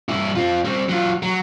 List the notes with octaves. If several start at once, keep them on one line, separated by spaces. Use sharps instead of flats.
G2 E4
C4 F4
G3 C4
F#3 F4
F#3